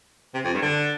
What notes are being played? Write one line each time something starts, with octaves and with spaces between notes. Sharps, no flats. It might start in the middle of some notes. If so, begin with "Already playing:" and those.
C3
F2
G2
D3